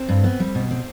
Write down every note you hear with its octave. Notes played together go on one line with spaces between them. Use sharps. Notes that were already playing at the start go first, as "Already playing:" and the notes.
Already playing: C4
G2
B3
G3
B2
C4